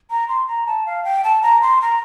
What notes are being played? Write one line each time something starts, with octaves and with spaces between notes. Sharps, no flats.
A#5
C6
A#5
A5
F5
G5
A5
A#5
C6
A#5